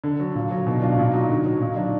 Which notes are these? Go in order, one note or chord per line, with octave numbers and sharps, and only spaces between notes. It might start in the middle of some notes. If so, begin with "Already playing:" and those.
D3
F#3
A#2
F#3
B2 D#4
F#3 D4 F4
A#2 D#4 F#4
F#3 D#4 F#4
D3 D#4
F#3
A#2 D#4
F#3 D4